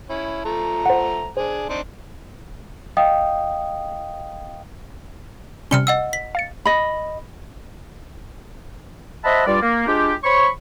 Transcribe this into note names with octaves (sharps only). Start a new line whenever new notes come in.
C#4 E4
F3 A3 A#5
C5 F#5
D4 G#4 C5
C4 D4 D#4
D#5 F5 G5 D#6
C3 G3 C#4 F6 C#7 G7
D#5 F#5 E6
B6
F5 A6 C#7
D#5 B5
C5 D#5 E5 F#5 A5 B5
G2 G3 F4 D5
A#3
G#3 D4 F4 G4
C5 C#5 B5 C#6